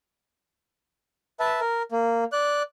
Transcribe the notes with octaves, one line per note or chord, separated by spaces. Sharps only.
B4 E5 A5
A#4
A#3
D5 F#6